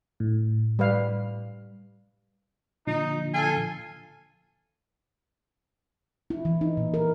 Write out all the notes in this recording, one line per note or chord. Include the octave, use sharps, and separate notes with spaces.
A2
G3 B4 F5
A#2 D3 F3 D#4
F4 A4 G#5
E4
E3
D#4
A#2
A#4